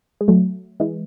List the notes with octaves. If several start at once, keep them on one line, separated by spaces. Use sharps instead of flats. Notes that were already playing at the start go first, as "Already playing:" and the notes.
G#3
F#3 A3
E3 G#3